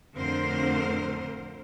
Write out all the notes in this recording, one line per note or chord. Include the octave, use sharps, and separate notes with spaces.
F2 A2 D3 C4 A#4 C5